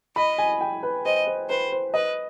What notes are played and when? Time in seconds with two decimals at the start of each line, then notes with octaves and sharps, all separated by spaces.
0.16 D#5 B5
0.38 G#5
0.61 G5
0.83 B4
1.05 C5 D#5
1.27 C5
1.50 B4 C5
1.72 C5
1.94 B4 D#5